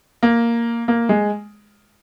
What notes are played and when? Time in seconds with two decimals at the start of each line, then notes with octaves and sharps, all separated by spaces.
0.23 A#3
0.88 A#3
1.09 G#3